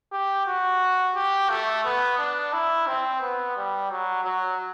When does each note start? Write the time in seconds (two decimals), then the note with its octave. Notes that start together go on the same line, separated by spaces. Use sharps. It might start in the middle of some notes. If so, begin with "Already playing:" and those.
0.12 G4
0.47 F#4
1.15 G4
1.50 A3
1.85 B3
2.19 D4
2.53 E4
2.87 C4
3.21 B3
3.57 G3
3.91 F#3
4.25 F#3